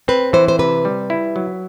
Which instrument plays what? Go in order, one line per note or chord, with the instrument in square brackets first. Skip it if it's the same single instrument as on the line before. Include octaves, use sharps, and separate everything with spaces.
[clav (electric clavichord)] C4 [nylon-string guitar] B4
[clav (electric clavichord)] E3 [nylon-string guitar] C5
[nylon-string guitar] C5
[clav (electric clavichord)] C3 [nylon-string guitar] B4
[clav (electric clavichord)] G3
E4
F#3